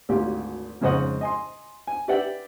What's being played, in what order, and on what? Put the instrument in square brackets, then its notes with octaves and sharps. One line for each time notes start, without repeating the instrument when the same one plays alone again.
[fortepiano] G#1 D2 F4 G4
F2 G#2 C#3 C5 D#5 F#5
D#5 G#5 C6
G#5
G4 B4 D5 E5 F#5 G5